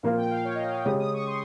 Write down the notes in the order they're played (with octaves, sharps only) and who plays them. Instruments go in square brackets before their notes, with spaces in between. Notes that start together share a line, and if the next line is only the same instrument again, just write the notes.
[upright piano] A#2 F3 A#3 F4 A#4 [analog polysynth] F5
[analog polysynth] G5
F5
C#5
D#5
F5
G5
[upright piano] C#3 G#3 C#4 G4 [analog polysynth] D#6
[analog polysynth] D#6
C#6
C6